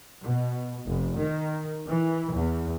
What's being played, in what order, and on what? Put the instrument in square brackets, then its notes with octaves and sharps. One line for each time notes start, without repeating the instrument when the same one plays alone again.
[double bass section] B2
F1
D#3
E3
E2